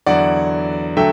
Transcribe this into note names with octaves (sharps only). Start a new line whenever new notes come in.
E2 D3 F#3 D5 F#5
D3 F#3 A3 E5 G5